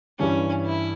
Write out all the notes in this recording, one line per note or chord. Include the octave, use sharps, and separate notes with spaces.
G2 E3 G3 C#4
E4